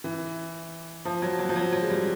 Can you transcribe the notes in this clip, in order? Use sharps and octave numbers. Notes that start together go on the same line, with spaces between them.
E3
F3
F#3
F#3
F3
F#3
F#3
G#3
G3